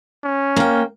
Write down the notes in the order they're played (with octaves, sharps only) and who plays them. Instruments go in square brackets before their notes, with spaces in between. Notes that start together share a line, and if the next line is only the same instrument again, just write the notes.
[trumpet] C#4
[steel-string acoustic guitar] A#3 G5